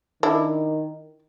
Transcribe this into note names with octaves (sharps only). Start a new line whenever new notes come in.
D#3 D4 E4